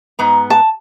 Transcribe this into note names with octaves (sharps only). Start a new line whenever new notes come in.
G#2 B3 A#5
A5